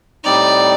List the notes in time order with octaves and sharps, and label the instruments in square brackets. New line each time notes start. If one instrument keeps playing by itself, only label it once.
[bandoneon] A2 G3 C4 D#4 [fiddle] D5